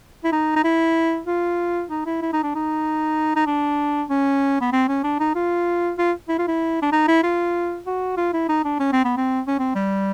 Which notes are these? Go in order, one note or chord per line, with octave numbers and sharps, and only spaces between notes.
E4
D#4
D#4
E4
F4
D#4
E4
E4
D#4
D4
D#4
D#4
D4
C#4
B3
C4
C#4
D4
D#4
F4
F4
E4
F4
E4
D4
D#4
E4
F4
F#4
F4
E4
D#4
D4
C#4
C4
B3
C4
C#4
C4
G3